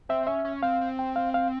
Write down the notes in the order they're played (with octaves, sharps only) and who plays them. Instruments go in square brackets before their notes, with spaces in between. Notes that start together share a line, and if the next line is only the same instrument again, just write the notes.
[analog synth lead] C4 [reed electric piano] E5
[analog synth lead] C#4 [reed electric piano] E5
[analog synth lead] C#4
[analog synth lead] C4 [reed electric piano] F5
[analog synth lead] C4
[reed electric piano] G5
F5
F5